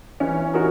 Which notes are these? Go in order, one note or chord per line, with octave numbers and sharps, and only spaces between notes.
E3 C#4
D#4 F#4 A#4